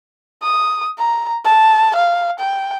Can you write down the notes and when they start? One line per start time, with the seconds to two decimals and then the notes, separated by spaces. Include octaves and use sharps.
0.43 D#6
0.98 A#5
1.45 A5
1.96 F5
2.39 G5